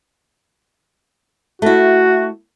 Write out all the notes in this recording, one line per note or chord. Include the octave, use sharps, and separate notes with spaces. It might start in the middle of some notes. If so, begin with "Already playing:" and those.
A3 E4 F#4